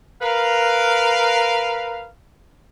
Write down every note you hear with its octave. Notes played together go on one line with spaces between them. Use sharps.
A#4 B4 F5